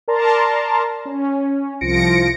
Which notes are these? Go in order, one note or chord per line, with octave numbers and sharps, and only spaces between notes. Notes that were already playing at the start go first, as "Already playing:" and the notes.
A#4 D5 A5 A#5 C6
C#4
C2 F3 F4 A#6 C#7 D7